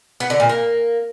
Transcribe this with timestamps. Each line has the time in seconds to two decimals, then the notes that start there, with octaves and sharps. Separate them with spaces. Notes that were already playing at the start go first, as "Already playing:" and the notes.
0.20 B3
0.30 D3
0.40 A#2
0.49 A#3